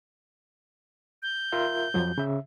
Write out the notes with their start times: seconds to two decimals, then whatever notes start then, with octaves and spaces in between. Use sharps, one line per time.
1.23 G6
1.52 F4 A#4 E5
1.94 F2 F3 F#3
2.18 C#3 E5